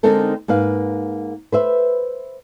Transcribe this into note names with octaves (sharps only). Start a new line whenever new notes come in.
D3 G#3 C4 D#4 A4 A#4
G#2 A#3 B4 F5
B4 C5 E5